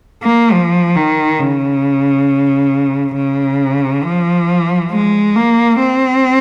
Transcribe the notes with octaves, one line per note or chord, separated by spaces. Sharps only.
A#3
F3
D#3
C#3
C#3
F3
G#3
A#3
C4